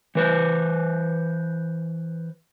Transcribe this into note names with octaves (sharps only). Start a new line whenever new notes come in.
E3 B4 C5